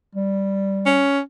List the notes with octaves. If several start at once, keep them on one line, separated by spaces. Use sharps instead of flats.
G3
C#4